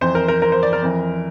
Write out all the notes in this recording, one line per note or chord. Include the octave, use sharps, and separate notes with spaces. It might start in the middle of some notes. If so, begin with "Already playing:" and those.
F2 E3 C5
A#4
A#4
A#4
C5
D5
A#4
F2 E3